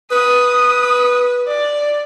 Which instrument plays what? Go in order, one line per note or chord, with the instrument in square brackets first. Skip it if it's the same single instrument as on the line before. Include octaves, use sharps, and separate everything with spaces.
[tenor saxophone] B4 [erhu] D#6
[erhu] D5